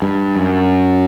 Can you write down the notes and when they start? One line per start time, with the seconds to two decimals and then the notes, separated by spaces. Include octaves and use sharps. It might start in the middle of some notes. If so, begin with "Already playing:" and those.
0.02 G2
0.36 F#2